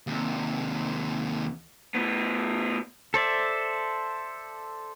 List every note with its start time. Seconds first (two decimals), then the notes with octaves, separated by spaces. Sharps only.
0.07 D#2 C3
1.95 A2 B3
3.14 A4 C5 D5 E5